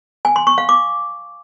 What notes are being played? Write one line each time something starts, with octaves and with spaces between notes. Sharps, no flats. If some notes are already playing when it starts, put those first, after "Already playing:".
G#5
C6
C#6
F5
D6